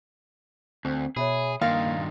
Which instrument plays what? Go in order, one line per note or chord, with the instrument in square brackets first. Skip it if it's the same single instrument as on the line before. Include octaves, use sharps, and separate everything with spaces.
[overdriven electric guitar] D2 [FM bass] C4
[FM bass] B2 [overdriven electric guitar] G#4 [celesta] C#5 E5 B5
[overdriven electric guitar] G2 D#3 [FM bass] A#3 [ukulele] F5 [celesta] C6 A6 A#6